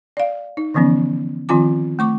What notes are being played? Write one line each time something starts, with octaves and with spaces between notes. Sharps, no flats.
D5 F5
D#4
D3 E3 F3 B3 C#4
D#3 F3 C4 F4 G#5 D6
A3 C#6 D6